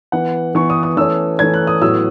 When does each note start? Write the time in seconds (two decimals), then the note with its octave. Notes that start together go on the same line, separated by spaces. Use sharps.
0.12 E3 B3 F#5
0.55 E3 B3 C#6
0.70 D#6
0.83 D#6
0.97 E3 A3 C#4 E6
1.39 E3 A3 C#4 G#6
1.54 F#6
1.67 D#6
1.81 A2 F#3 B3 E6